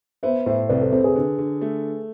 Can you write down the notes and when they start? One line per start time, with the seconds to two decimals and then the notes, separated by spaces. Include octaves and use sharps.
0.23 B3 C5 E5
0.46 A2 C5 E5
0.69 C2 B4 D5
0.81 A4 C5
0.92 C3 A4 C5
1.04 G#4 B4
1.16 D3
1.38 D3
1.61 A3